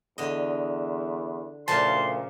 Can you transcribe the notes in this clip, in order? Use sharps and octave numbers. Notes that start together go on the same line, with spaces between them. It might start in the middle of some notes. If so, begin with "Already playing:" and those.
E2 D3 D#5
D2 A#2 C#3 F3 A5 C6